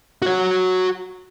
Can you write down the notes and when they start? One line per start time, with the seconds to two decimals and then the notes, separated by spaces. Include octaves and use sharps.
0.22 F#4 C#5